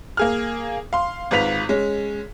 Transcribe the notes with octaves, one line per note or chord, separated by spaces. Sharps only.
A#3 G#4 F6
F5 C6
G#1 G#2 F4 B4 B6 F7
G#3 C#4